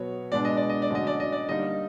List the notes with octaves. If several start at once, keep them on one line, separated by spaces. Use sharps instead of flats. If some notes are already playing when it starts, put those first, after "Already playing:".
Already playing: B2 F#3 B3 C#5
B2 G#3 B3 D4 D5
D#5
D5
D#5
D5
D3 F#3 A3 C#4 D#5
D5
D#5
D5
D3 G3 A#3 D#4 D#5